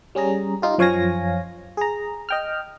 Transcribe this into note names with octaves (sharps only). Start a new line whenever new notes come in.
G3 C#4 G#4 A#5
D#4 F4 G4
F#2 F3 C#5 F5 G#5 A#6
G#4 A#5
D#5 G5 F6